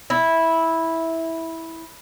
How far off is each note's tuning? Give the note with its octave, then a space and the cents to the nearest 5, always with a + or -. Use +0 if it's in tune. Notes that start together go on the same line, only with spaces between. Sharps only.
E4 -10